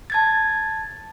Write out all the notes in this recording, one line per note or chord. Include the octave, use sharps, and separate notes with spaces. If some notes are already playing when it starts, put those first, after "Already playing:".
A5 G#6 A6